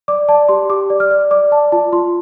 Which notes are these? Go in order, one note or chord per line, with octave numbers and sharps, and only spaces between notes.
D5 D6
D5 A5
G4 C6
G4 D6
D5
F6
D5
D5 D6
D5 A5
F4 A5
F4 C6